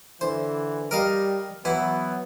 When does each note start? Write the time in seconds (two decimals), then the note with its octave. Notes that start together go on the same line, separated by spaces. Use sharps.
0.21 D3 E3 C5
0.91 G3 A#4 D#5 F5
1.65 E3 F#3 B3 E4